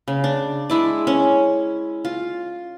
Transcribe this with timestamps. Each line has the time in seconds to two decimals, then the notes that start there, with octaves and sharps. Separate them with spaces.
0.08 C#3
0.24 D4
0.70 G#3 E4 D5
1.07 C#4
2.05 F4